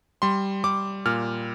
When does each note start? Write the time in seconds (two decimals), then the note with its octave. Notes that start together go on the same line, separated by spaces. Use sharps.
0.22 G3 C6
0.64 G3 D6
1.06 A#2 F6